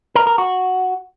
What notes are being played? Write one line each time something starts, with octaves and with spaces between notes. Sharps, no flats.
A#4
A#4
F#4